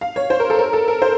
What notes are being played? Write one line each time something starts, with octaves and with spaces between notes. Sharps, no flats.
F5
C#5
C5
A#4
A4
A#4
A4
A#4
C5